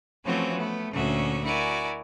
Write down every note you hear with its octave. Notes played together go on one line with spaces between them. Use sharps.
E3 F3 A3 C4 C#4 F#4
A3 B3
D2 A#2 D3 C#4 F#4 E5
E4 F#4 A#4 D5 G#5